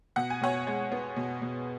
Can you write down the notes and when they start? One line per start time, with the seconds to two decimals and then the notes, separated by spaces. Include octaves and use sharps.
0.16 B2 F#5
0.30 G#5
0.41 B2 C#5 F#5
0.67 G#3
0.92 B3
1.16 B2
1.42 B2